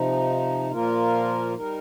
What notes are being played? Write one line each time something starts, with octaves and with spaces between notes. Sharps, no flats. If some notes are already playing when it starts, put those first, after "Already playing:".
Already playing: C3 F3 D#4
A#2 F3 A#3 F4 A#4
G3 D#4 A#4